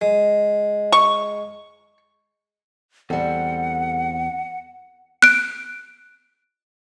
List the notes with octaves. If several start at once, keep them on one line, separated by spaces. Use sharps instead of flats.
G#3
C#6
E2 G3 C4 A4 F#5
F#6 D7